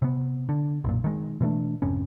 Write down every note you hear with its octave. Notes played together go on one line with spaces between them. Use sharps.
C3 B3
D3
B1 F#2 A#2
D#3 G#3
B2 E3 A3 D4
G#1 F2 C3 C#4